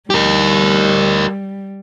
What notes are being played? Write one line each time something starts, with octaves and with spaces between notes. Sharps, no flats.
G3 G4 A#4